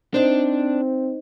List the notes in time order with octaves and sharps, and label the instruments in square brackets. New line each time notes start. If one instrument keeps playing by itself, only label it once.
[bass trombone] C4 [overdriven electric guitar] D4 [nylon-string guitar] D#4 C5